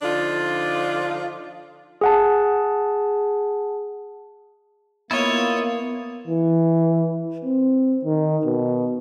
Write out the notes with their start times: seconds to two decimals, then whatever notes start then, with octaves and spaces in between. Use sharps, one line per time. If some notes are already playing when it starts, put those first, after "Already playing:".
0.02 D3 F3 D4 D#4 F4
2.01 G#4 F#5 A5
5.11 A#3 B3 E4 F4 C#5 D#5
6.28 E3
7.45 C4
8.05 D#3
8.46 B2